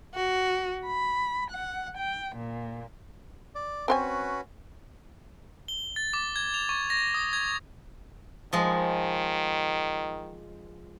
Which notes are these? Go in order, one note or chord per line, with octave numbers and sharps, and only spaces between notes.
F#4
B5
F#5
G5
A#2
D5
C4 C#4 F#4 B4 C5 G#5
G7
A6
D6
G#6
F7
C#6
A#6
D#6
G#6
D#3 F3 G#3